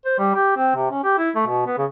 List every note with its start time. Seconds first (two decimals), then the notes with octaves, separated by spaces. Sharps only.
0.05 C5
0.19 G3
0.35 G4
0.57 C4
0.75 C3
0.91 C#4
1.04 G4
1.18 E4
1.35 A3
1.47 B2
1.66 B3
1.78 C#3